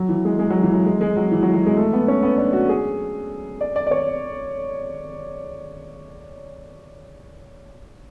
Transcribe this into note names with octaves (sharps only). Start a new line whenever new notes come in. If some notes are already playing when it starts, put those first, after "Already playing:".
Already playing: F#3
E3
G#3
G#3
F#3
E3
F#3
G#3
G#3
F#3
E3
F#3
F#3
G#3
A3
B3
C#4
B3
D4
F#4
G#4
D5
D5
D5
C#5